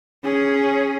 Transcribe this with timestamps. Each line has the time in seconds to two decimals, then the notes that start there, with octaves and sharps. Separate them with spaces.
0.24 C#4 G#4